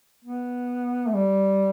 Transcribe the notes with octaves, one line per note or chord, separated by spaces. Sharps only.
B3
A3
G3